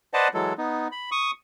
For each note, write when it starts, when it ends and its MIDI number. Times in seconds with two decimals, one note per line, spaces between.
0.14 0.28 71
0.14 0.28 72
0.14 0.28 74
0.14 0.28 75
0.14 0.28 78
0.14 0.28 81
0.34 0.53 52
0.34 0.53 54
0.34 0.53 56
0.34 0.53 69
0.58 0.88 59
0.58 0.88 63
0.92 1.10 83
1.12 1.31 85
1.12 1.31 87